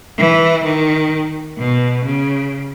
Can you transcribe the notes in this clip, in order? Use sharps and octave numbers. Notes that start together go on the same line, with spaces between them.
E3
D#3
B2
C#3